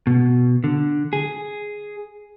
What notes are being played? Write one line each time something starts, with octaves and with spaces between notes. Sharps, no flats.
B2
D3
G#4